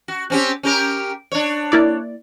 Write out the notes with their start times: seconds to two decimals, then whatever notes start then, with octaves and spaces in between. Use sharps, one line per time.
0.08 F#4
0.30 C4 C#4 G4
0.63 C#4 G4 A#4
1.32 D4 C#5
1.72 A#3 E4 D5